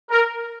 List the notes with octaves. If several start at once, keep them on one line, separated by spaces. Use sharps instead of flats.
A#4